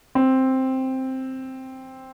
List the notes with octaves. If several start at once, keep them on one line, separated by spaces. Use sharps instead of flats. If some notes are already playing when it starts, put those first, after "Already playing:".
C4